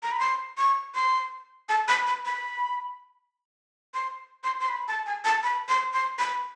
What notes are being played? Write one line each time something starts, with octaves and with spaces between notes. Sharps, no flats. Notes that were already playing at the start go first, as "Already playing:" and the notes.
A#5
B5
C6
C#6
C6
A5
B5
B5
B5
C6
C6
C6
B5
A5
G#5
A5
B5
C6
C6
B5